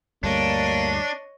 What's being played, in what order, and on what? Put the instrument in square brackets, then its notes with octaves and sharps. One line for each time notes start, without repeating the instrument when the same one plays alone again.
[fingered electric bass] D2 G2 D3 [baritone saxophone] A#3 [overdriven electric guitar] D4 [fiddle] C#5 D#5